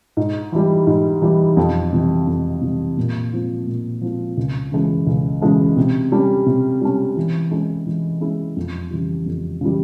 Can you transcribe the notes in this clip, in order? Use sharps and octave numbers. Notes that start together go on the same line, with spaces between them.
G#2
E3 G3
G#2
E3 G3
F2
C3 E3 G3
F2
C3 E3 G3
A#2
F3 C4 F4
A#2
F3 C4 F4
C#2
C#3 E3 G#3 C#4
C#2
C#3 E3 G#3 C#4
C3
G3 C#4
C3
G3 C#4
E3
G#3 C#4 E4 G#4
E3
G#3 C#4 E4 G#4
F2
C#3 E3 G3
F2
C#3 E3 G3